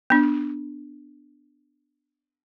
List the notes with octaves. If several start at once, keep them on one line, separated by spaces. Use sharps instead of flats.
B3 D4